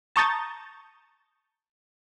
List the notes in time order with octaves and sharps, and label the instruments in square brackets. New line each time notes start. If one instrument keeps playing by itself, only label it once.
[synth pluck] A5 A#5 C#6 D#6 G6 A6